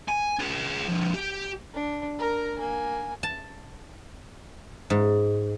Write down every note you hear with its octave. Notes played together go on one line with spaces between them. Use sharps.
G#5
F4 G#4
D3 F3
G4
D4
A#4 A#5
A#3 G#5
A5
G#2